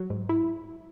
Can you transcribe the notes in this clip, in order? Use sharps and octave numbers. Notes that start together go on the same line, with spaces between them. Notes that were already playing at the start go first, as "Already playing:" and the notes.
Already playing: F#3
G#2
E4